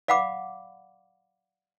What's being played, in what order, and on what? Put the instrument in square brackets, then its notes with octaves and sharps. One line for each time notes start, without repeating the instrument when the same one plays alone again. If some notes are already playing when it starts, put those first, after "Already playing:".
[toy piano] D5 F5 F#5 B5 D6